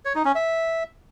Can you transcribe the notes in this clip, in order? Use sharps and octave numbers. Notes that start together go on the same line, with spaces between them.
C#5
D#4
C#4
E5